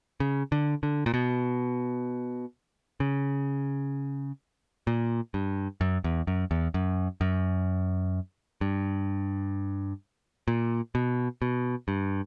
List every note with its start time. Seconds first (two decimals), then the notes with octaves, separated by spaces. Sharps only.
0.20 C#3
0.52 D3
0.83 D3
1.06 A#2
1.14 B2
3.00 C#3
4.87 A#2
5.34 G2
5.81 F#2
6.04 E2
6.27 F#2
6.51 E2
6.74 F#2
7.21 F#2
8.61 G2
10.48 A#2
10.95 B2
11.42 B2
11.88 G2